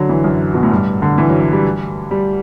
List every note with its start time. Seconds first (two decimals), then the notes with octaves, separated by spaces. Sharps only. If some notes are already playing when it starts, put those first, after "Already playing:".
Already playing: D3 F#3
0.09 E3
0.24 F#2
0.54 B2
0.63 A2
0.71 G2
1.02 D3
1.18 E3
1.30 F#3
1.41 F#3
1.52 G3
2.11 G3